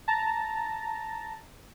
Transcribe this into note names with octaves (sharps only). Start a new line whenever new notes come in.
A5 A#5